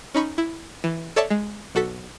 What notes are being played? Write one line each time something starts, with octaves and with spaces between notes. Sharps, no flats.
C#4 D#4 B5 C#6
E4
E3
A4 C#5 D5 E5 A5
G#3
B1 F#4 A4 B6